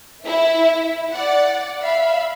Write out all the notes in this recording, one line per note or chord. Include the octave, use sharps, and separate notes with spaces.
E4 E5
D5 F#5
E5 F5 B5